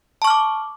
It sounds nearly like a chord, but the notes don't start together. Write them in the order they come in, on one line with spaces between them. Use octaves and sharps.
A5 C#6 F6 D6